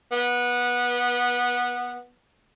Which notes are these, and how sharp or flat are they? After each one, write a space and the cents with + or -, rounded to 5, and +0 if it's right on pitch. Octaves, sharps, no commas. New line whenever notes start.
B3 -15